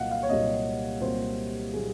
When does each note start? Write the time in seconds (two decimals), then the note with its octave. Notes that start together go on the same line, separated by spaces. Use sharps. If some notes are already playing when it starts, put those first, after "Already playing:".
Already playing: C2 A#2 F#3 A#3 D#5 F5 F#5
0.11 F5
0.23 C#5
0.29 C2 A#2 F#3 A#3 D#5
1.01 C2 A#2 F#3 A#3 C5
1.73 A#2 F#3 A#3 G#4